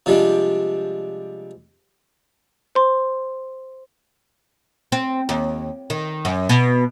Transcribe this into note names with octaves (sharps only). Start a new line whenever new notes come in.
C3 F3 G3 G#3 D4
C5 C6
C4
D#2
D#3
F#2
B2